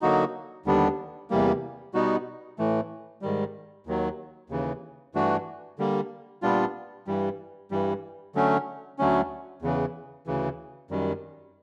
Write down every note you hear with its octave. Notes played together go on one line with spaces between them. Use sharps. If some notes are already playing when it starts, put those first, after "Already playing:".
D3 F#3 A#3 D#4 F#4
D#2 D3 G3 B3 D4
E2 C3 E3 G3 A#3
B2 G3 B3 D#4 F#4
A2 E3 A3
G#2 D#3 G3
D#2 D#3 F#3
D#2 C#3 E3
G2 E3 A3 D4 F#4
D3 G3 A#3
A#2 G3 B3 D4 F4
G2 E3 G3
G2 E3 G3
D3 F#3 A3 C#4
D2 D3 F#3 A3 C#4
E2 C#3 E3
D2 C#3 E3
F#2 D#3 G3